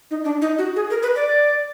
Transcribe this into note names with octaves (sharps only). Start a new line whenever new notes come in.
D#4
D4
D#4
F#4
G#4
A#4
B4
D5